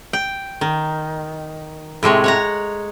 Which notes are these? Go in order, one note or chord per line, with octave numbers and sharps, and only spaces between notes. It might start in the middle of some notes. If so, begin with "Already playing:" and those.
G5
D#3
A2 C3 G#3 C#5
C#5 F#5 A#5